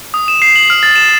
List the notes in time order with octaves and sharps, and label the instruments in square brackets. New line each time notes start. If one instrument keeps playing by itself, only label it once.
[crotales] D#6
E7
C7
F#7
F6
A6
E7